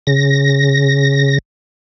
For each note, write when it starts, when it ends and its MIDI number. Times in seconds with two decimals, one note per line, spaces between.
0.07 1.38 49
0.07 1.38 94